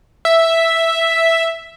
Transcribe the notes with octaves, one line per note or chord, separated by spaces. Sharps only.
E5